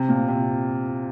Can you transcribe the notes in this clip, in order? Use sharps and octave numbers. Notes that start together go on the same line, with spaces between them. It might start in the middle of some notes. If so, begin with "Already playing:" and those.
Already playing: C3
A#2
C3